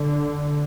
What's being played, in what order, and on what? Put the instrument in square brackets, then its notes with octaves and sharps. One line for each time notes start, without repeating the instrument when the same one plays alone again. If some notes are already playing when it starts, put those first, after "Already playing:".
Already playing: [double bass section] D3